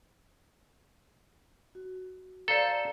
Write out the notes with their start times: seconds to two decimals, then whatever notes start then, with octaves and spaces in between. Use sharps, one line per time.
1.75 F#4
2.48 A4 C5 D5 F5 A#5